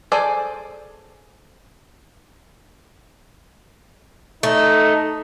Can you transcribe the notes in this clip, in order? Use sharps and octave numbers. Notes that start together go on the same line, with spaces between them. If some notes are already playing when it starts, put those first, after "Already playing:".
G#4 A4 C5 D5 G#5
A3 D#4